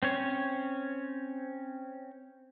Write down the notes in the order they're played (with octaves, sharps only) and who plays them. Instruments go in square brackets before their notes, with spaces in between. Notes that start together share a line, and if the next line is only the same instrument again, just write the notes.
[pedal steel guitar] C4 C#4 C#5